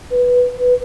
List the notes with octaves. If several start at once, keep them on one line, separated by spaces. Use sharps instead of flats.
B4